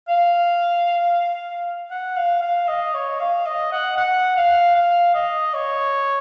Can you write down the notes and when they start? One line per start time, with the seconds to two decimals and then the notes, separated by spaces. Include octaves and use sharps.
0.09 F5
1.91 F#5
2.17 F5
2.42 F5
2.68 D#5
2.95 C#5
3.20 F5
3.46 D#5
3.72 F#5
3.98 F#5
4.37 F5
4.76 F5
5.15 D#5
5.55 C#5